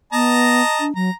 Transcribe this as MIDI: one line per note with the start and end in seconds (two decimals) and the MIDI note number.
0.13 0.62 59
0.13 0.85 75
0.13 0.85 81
0.13 0.85 82
0.80 0.95 62
0.95 1.10 54
0.95 1.15 82